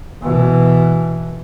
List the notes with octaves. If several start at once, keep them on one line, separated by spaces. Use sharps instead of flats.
B2 E3